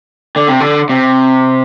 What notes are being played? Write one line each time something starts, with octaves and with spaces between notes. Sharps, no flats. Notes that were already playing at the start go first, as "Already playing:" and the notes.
D3
C3
D3
C3